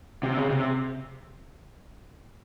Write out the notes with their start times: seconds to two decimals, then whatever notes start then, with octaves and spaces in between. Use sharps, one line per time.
0.23 C3
0.37 C#3
0.50 C3